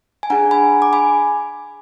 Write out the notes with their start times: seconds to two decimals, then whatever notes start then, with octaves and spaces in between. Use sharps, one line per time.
0.23 G#5
0.30 D4 G#4 F#5 A#5
0.51 G#5 B5
0.82 D6
0.93 G#5 B5